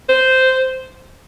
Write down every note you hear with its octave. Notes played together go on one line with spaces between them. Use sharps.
C5